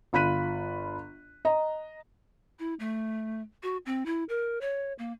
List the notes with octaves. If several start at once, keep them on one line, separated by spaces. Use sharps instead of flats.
G1 F4 B5 F#6 B6 D#7
D#5 A#5
E4
A3
F#4
C4
E4
A#4
C#5
A#3